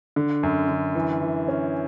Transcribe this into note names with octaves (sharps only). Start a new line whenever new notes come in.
D3
F#2
D3
E3
E3
C#4